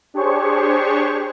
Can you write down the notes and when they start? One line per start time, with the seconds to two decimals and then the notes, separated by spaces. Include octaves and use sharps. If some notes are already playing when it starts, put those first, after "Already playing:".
0.14 D4 G4 G#4 C5 C#5 C#6